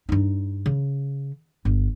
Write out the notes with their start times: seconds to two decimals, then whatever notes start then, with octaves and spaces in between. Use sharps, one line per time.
0.09 G2 D#4
0.66 C#3
1.65 G1